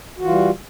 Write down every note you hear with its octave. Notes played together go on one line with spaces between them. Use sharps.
E3 G3 F4 F#4